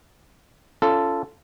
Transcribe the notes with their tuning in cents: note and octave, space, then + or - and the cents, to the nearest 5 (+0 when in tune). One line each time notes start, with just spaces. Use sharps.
C#4 +15 F4 -20 A4 +0